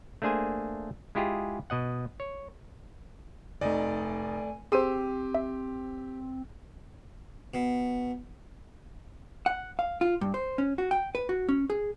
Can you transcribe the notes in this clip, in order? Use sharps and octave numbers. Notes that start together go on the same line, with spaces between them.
A3 A#3 D4 G#4 C5 G#5
G#3 E4 F4 G4 G#4
B2 D#5 F#5
C#5
F1 A3 D#4 D5 G#5
C4 G4 G#4 C5 C6 E6 D#7
E5
B2
F#5
F5
F4
G2
C5
C#4
F#4
G5
B4
F#4
C#4
G#4